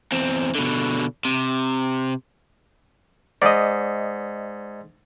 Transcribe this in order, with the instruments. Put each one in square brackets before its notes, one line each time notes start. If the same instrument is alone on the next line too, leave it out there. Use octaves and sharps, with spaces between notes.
[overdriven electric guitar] E2 C4
B2 D3
C3
[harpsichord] G#2 [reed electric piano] D5 D#5